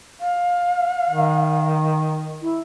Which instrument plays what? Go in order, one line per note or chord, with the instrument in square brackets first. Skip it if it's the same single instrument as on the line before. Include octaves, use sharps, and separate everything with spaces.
[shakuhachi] F5
[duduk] D#3
[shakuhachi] E4